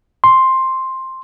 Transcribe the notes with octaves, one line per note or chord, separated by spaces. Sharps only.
C6